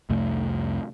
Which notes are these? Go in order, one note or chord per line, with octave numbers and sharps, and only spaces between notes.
C2 F2 C3 A3